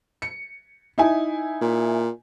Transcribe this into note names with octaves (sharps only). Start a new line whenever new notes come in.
C#7
D#4 E4 G#5
A#2